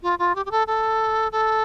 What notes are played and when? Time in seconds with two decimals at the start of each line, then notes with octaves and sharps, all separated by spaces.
0.03 F4
0.19 F4
0.35 G4
0.46 G4
0.51 A4
0.67 A4
1.32 A4